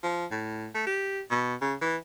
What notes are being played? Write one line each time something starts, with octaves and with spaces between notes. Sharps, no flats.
F3
A2
A3
G4
B2
C#3
E3